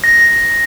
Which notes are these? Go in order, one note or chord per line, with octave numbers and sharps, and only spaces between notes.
A#6